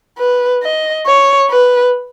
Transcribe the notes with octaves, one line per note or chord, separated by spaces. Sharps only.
B4
D#5
C#5
B4